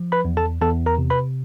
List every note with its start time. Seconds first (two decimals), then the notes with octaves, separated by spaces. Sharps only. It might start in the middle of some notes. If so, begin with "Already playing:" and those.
Already playing: F3
0.12 B4 B5
0.25 E2
0.37 A4 A5
0.61 E2 A4 A5
0.86 A#4 A#5
0.98 C3
1.10 B4 B5